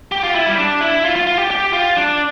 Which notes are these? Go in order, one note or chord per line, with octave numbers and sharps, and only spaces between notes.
G4
F4
E4
G3
D4
E4
F4
F4
F4
G4
G4
F4
D4